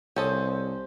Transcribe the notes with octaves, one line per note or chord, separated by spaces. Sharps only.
C2 C#4 A4 C5 D#5